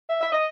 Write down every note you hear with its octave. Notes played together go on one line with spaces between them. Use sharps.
E5
E5
D#5